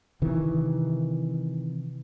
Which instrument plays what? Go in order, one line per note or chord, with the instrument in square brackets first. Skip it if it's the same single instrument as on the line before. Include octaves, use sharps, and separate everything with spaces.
[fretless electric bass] C3 D#3 E3